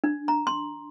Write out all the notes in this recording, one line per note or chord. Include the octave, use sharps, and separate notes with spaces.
D4
A#5
C6